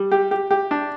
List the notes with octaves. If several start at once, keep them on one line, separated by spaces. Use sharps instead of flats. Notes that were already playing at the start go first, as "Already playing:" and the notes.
Already playing: G3
G4
G4
G4
D4